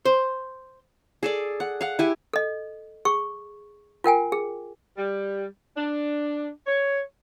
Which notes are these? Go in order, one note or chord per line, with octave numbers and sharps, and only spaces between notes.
C5
G#4 A4 D5
F#5
F5 F#5
E4 G4 G#5
A4 D#5
G#4 C#6
F4 A#4 G5 G#5
G#4
G3
D4
C#5